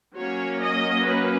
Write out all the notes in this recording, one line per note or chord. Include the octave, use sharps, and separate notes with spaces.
F#3 A#3 C#4 C#5
D#5
B4